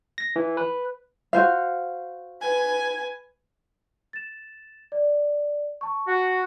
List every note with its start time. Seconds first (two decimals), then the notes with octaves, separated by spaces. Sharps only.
0.18 A#6
0.36 E3
0.57 B4
1.33 F#4 C5 F5
2.42 B4 G#5
4.13 A6 E7
4.92 D5
5.81 A5 C#6
6.07 F#4